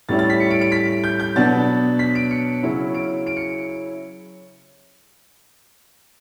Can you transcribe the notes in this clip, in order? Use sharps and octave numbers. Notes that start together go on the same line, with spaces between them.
A2 G3 C#4 E4 A6
A6
B6
C#7
D7
D7
B6
G6
G6
B2 F#3 B3 D4 A6
B6
D7
C#7
C#3 F#3 C#4 E4
D7
D7
C#7